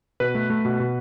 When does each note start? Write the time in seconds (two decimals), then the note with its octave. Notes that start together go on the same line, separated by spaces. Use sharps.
0.20 B2 B4
0.35 A3
0.50 A3
0.65 B2
0.80 B2